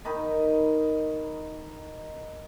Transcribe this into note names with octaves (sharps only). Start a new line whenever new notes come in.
D#3 D#4 D#5 B5